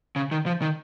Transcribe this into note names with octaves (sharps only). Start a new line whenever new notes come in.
C#3
D#3
F3
D#3